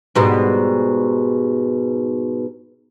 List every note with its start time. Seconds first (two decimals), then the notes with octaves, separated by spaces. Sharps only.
0.15 G#2 B2 G3